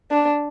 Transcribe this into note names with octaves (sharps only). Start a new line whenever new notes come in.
D4